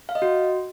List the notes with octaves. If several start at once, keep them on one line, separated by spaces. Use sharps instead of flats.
F5
D#5
F#4